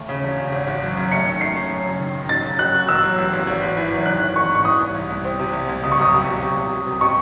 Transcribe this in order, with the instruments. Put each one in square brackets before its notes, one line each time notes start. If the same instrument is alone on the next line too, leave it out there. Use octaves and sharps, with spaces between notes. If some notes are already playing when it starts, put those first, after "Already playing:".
Already playing: [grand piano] D#2 A3
C#3
E1
C#3
G#1
G#1
F#2
F#2
[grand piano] A3 [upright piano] C#7
[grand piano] D#3
[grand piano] A3 [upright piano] C7
[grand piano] C#4
F#2
F#1
D#3
D#3
[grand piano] F#3 [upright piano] A6
[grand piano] C#3
[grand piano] F#3 [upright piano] F#6
[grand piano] F#4
[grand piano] A1 [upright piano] E6
[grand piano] F#3
A1
A1
G#1
G#1
E3
F#2
[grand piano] D#3 [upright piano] F#6
[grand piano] G#1
[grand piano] G#1 [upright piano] C#6
[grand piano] G#2 [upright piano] C#6
[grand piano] E3 [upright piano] D#6
[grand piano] C2
C2
C2
C4
C3
C2
C2
[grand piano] C#2 [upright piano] D#6
[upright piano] C#6
[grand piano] F#3 [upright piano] D#6
[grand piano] C3
F#3
C3
C2
F#3
C3
[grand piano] C3 [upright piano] C#6